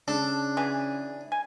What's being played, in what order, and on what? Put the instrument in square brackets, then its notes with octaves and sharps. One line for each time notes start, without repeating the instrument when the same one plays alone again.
[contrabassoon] C#3 [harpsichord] D4 [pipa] A4
[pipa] E3 F#3 G#4
G#5